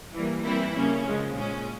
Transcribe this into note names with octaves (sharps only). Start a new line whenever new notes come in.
E3 G3 A#3
E3 G3 A#3 C4 E4
C#3 G3 A#3 C#4
C#3 F3 G#3
A#2 G#3 C#4